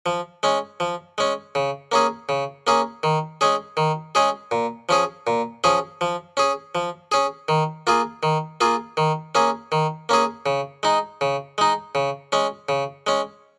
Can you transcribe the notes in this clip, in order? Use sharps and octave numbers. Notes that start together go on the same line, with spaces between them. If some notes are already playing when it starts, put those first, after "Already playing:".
F3
G#3 C#4
F3
G#3 C#4
C#3
A#3 C#4 G#4
C#3
A#3 C#4 G#4
D#3
G#3 C#4 G#4
D#3
G#3 C#4 G#4
A#2
F3 C#4 G#4
A#2
F3 C#4 G#4
F3
C#4 G#4
F3
C#4 G#4
D#3
A#3 F4 G#4
D#3
A#3 F4 G#4
D#3
A#3 C#4 G#4
D#3
A#3 C#4 G#4
C#3
G#3 D#4
C#3
G#3 D#4
C#3
G#3 C#4
C#3
G#3 C#4